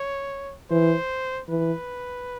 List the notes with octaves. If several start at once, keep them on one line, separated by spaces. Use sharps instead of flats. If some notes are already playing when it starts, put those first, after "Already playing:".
Already playing: C#5
E3 C5
E3 B4